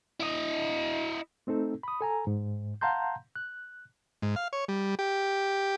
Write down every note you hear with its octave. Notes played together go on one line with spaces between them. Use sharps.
E4 D#5
A3 C4 D#4 A4
B5 D#6
A4 G#5 A#5
G#2
F5 F#5 A5 A#5 C6 G6
F#6
G#2
F5
C#5
G3
G4